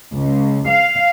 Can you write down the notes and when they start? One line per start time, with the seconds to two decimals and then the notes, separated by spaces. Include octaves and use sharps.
0.16 C#2
0.69 F5